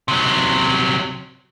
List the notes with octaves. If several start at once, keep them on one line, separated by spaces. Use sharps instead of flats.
C3 F#3